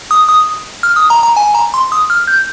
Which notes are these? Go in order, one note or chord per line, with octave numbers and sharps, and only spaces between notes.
D#6
D#6
F6
D#6
A#5
A#5
G#5
A#5
C6
D#6
F6
G6